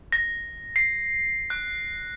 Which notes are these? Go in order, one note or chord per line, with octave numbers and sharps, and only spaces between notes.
A#6
C7
F#6